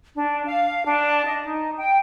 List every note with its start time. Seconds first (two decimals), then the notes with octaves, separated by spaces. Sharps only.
0.15 D4
0.46 F5
0.85 D4
1.26 D#5
1.45 D#4
1.77 G5